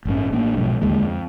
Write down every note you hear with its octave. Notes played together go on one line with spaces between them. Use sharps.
A1 G2 C#4
A1 A#3 D4
B1 G#2 B2 F3
D#2 D3 G#3 A#3
F2